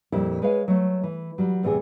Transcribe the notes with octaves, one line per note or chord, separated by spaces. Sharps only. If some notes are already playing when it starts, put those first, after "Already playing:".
F2 A#2 G3 E4 A#4
G#3 B4 C#5 F5
F#3 A3
E3
F#3 G3 F#4
E2 A2 C3 G#4